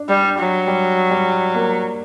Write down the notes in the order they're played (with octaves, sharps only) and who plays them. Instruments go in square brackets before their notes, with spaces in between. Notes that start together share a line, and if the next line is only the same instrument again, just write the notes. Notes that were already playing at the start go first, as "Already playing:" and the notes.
Already playing: [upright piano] D4
[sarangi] G3
[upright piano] D4
[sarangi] F#3
[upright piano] G3
G3
A#3